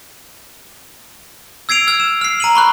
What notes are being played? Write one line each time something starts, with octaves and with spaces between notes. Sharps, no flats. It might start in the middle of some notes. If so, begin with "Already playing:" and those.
E6 G#6 C7 D7 F7
E6 F6 G#6
E7
F6 C7
A#5 D#7 F#7
B5 C#6 F#6